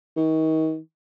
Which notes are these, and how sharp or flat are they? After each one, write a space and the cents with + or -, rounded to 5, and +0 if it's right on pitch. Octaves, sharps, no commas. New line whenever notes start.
D#3 +35